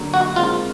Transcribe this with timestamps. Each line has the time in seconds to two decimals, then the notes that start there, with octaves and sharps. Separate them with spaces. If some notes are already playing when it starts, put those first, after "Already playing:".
Already playing: D3 F#3 A#3
0.14 F#4
0.36 D#3 G#3 C4 F4